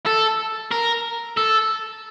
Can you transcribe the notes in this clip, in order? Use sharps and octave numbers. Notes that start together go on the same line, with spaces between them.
A4
A#4
A4